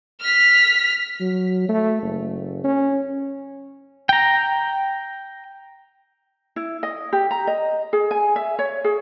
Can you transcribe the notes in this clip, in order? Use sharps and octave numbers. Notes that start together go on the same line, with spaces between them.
F6 B6
F#3
A3
F#1
C#4
G5 A#5
E4
D#5
G4
A#5
D#5
G#4
G#5
E5
C#5
G#4